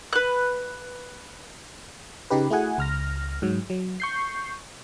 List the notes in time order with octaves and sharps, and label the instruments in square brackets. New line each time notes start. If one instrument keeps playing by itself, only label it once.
[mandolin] B4 F#6
[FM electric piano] C#3 D#4 G4 B4
A3 E4 F#4 G#4 F#5 G#5
C#2 F6 A#6
G#2 F#3
F#3
C#6 G6 C7